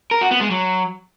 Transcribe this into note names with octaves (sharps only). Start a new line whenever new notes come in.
A#4
F#4
B3
G#3
F#3